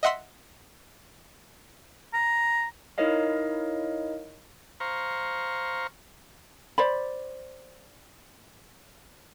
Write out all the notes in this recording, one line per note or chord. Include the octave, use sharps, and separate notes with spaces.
D#5 E5 F#5 C6 E6 B6
A#5
D#4 E4 A#4 C#5 D#5 F5
C5 F5 A#5 C#6
C5 D5 B5